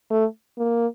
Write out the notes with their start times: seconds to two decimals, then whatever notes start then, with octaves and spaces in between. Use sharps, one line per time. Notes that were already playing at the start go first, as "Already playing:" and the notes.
0.11 A3
0.58 A#3